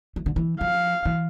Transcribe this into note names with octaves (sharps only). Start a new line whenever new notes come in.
E3
D3
E3
F3 F5
E3